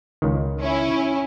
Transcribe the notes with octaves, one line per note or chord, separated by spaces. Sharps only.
C#2 D#3
C#4 E4